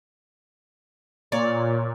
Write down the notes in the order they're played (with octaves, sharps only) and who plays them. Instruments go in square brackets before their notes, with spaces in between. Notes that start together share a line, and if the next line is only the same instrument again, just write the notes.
[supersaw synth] A#2 [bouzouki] C#5 D5